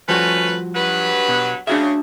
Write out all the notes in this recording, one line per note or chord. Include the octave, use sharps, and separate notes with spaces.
F3 G3 A3 C#4 F#4 B4
G2 F#3 B4
B2
C#3 D4 F#4 E5